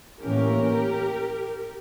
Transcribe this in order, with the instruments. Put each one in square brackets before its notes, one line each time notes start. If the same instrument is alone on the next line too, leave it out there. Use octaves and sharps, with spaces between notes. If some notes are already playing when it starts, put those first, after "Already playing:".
[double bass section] A2 E3 A#3 C#4 [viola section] G4 A#4